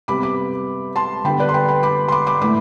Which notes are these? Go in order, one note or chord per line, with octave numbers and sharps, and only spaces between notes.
C3 G3 B3 B5 D6
B5 D6
A5 C6
D3 G3 B3 G5 B5
B4 D5
C6
G5 B5
G5 B5
B5 D6
C6
B5 D6
B5 D6
A2 E3 A3 B5 D6